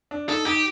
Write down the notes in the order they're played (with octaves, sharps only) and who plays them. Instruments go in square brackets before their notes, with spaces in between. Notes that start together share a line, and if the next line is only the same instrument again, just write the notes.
[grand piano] D4
[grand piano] D#4 [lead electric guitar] A4
[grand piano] D#4 [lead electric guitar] G4